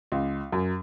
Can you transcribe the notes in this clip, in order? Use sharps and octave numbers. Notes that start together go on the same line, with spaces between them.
C#2
F#2